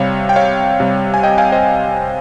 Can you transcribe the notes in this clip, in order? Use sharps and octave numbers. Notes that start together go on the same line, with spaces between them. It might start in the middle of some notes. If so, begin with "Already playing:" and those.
Already playing: C3 G3 C#5 F5
G5
C#5 F5
C3 G3
G#5
D#5 G5
F5 G#5
C5 D#5